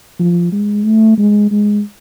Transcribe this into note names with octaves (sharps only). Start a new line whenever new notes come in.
F3
G#3
A3
G#3
G#3